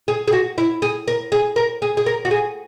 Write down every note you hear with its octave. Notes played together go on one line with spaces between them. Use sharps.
G#4
G#4
F#4
E4
G#4
A#4
G#4
A#4
G#4
G#4
A#4
F#4
G#4